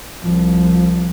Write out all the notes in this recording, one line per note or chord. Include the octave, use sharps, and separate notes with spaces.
C2 F3